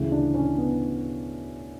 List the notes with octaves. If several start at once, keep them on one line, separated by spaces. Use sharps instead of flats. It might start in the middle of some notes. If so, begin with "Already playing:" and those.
Already playing: D2 C#3 E3
D4
C#4
B3